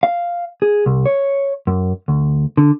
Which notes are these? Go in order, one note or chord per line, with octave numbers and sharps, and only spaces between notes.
F5
G#4
C2
C#5
F#2
D2
D3